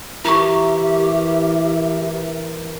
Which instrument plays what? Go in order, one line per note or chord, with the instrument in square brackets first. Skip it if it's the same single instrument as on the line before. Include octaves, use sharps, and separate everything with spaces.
[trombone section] E3 A#4 [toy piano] E4 C#6 [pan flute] G4 [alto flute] E5